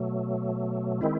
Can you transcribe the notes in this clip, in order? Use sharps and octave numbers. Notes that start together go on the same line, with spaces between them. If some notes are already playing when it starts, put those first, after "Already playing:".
Already playing: B2 F#3 A3
D#3 G#3 C4 E4